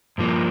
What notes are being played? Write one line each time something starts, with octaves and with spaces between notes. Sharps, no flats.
G2 F3 A#3